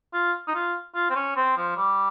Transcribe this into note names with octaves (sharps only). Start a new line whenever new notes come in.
F4
D#4
F4
F4
C4
C#4
C4
F3
G3